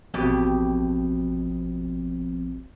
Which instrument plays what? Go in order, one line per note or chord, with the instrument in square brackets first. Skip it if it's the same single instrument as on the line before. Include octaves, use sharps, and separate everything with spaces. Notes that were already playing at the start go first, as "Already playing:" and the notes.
[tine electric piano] A1 C4 [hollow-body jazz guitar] F2 B2 G4